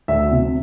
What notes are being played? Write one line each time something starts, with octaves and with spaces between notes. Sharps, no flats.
D2 E5
C3